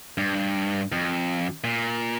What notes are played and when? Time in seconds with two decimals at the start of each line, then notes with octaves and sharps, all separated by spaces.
0.18 G2
0.92 F2
1.64 A#2